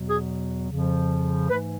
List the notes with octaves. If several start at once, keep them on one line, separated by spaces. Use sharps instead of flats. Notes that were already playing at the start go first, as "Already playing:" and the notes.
Already playing: E2 B2 F#3 B3
G#4
F2 C#3 F3
G#2 E3 A3 B4